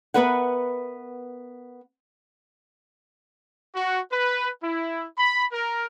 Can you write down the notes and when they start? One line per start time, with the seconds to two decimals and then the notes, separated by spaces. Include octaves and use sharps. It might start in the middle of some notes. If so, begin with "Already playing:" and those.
0.14 B3 A#4 B4 E5 F#5
3.74 F#4
4.11 B4
4.62 E4
5.17 B5
5.52 A#4